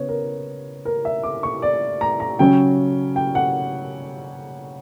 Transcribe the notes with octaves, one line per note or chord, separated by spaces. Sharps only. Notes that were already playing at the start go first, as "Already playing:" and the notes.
Already playing: C#3 B3 C#5
A#4
A#4
E5
D6
C#6
D5
A#5
A#5
C#3 F#3 C#4 G5
G5
F#5